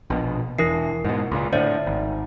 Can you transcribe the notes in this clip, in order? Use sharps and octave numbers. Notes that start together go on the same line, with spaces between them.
A#1 B2
E1 E3 E4 A#4 C7
G#2 B2
C#2 A#2
A2 D3 C5 D5 E5
G#1